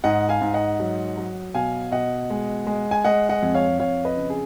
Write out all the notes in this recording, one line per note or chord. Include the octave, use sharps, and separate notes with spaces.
G#2 D#5 F#5
F5 G#5
G#2
D#5 F#5
F#3
F#3
B2 F5 G#5
B2 D#5 F#5
G#3
G#3
G#5
G#3 D#5 F#5
D#5 F#5
F2
C#5 F5
F2 C#5 F5
B4 D#5
C#3
G#4